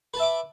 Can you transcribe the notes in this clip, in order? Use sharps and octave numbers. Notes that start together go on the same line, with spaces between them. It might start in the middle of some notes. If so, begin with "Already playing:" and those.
B4 E5 A5 D6